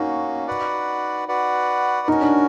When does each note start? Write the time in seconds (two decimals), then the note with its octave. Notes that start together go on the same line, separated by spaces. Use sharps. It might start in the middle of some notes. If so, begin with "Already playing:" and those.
Already playing: A#3 C#4 D#4 F#4
0.47 F#4 B4 D5 F#5
1.28 F#4 B4 D5 F#5
2.07 C#4 D#4 F#4 A#4
2.21 D4